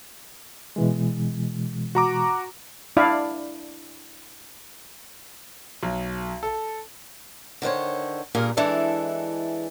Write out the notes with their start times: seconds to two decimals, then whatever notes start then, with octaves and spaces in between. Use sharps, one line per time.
0.76 B2 E3 G#3
1.95 F#4 A#5 D6
2.97 D4 E4 D5 F5
5.83 B1
6.43 A4
7.62 D3 D#3 C5 C#5
8.35 G2 A#2 G#4 A#4
8.57 E3 G#3 D4 E4 A4